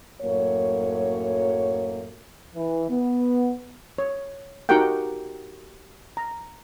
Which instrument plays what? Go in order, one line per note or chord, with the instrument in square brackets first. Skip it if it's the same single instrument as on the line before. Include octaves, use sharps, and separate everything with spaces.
[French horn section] F#2 A2 F#3 A#3 C#5
[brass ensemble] E3
B3
[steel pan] C#5
D#4 F#4 G4 A#4 F#5 G5
A#5